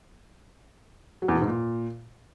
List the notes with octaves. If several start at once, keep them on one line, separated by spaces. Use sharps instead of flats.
F#3
E2
B2
G#2
A#2